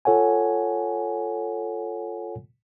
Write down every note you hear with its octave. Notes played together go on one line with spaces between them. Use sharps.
F4 A4 C#5 F#5 G#5